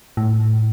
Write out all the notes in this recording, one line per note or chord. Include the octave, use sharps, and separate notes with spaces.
A2